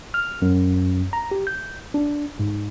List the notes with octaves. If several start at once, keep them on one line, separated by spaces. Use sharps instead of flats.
F6
F#2
A#5
G4
G6
D4
G#2